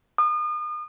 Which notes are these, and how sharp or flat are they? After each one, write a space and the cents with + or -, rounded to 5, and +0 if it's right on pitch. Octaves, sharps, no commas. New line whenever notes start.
D#6 -40